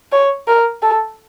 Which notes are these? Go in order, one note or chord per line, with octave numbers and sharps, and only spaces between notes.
C#5
A#4
A4